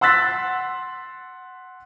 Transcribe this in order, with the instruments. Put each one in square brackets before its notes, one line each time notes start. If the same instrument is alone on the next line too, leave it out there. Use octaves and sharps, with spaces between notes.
[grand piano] F#5 C6 E6 F#6 A6 B6